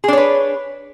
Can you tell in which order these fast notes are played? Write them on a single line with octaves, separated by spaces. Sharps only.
G#4 D4 C#5 B4